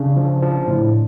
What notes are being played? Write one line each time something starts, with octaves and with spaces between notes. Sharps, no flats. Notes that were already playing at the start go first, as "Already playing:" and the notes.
Already playing: C#3 D4
F3
F3
A2